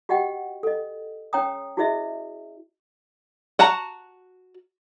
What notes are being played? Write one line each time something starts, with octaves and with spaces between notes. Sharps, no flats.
F#4 G4 D#5 F#5 G5
A4 D#5
C#4 C#5 G5 A#5 D#6
E4 F#4 G#4 C5 D#5 E5
F#4 F#5 A5 A#5